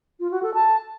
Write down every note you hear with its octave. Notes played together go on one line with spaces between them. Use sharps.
F4
F#4
A4
A5